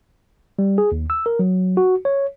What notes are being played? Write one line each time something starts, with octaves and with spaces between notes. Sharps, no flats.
G3
G#4
D#2
E6
A#4
F#3
F#4
C#5